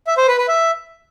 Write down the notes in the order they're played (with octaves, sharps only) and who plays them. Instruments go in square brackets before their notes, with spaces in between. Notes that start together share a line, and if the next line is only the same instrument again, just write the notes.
[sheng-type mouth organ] E5
C5
B4
B4
E5